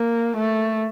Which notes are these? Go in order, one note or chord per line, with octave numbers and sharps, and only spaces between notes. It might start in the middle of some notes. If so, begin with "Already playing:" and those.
Already playing: A#3
A3